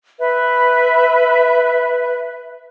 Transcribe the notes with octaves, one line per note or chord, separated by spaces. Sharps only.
B4 E5